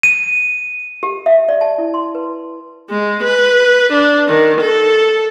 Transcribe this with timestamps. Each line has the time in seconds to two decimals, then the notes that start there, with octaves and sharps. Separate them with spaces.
0.03 D#7
1.03 G4
1.26 E5
1.49 D5
1.61 A5
1.78 E4
1.94 C6
2.15 B4
2.90 G#3
3.24 B4
3.93 D4
4.28 D#3
4.61 A4